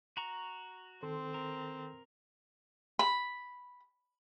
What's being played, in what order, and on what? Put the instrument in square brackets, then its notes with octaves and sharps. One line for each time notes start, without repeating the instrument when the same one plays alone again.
[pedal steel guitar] F#4 A#5 C#6
[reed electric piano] D#3 A4 C6 [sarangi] C4
[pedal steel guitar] A#4
[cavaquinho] B5